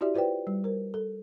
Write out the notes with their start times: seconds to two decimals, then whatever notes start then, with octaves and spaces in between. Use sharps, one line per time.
0.01 E4 F#4 G4 D5 E5
0.15 F4 B4 C5 D5 G5
0.47 G3
0.64 A#4 C5
0.94 A4